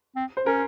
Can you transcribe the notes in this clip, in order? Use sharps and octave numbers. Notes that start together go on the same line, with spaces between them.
C4
C5
C#4 A#4